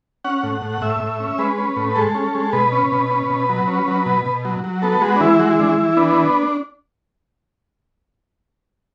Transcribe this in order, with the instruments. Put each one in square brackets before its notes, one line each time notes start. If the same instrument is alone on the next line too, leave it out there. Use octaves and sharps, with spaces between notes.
[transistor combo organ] C#4 F#5
A2
A2
A2 E5
A2
C#4
G#3 B4
C#4
A2
G#3 A4
C#4
G#3
B2 B4
C#4
B2
C#4
B2
F#3
C#4
F#3
B2
B2
F#3
F#3
B3 A4
G#3 F#4
D4
E3 E4
G#3 F#4
E4
E3 D4
E4
E3
B3 D4